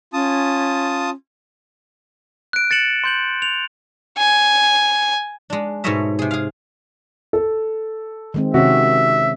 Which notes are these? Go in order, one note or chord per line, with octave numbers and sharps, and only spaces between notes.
C#4 F4 A5 D#6
F#6 D7
A6 C#7 E7 F#7
C6 G6 F#7
F7
G#5
G#3 D4
G#2 B2 A3 C#5 D#5 E5
C3 G#4
G#4 F5
A4
D#3 G#3 C4
C3 D#3 C#4 F#4 E5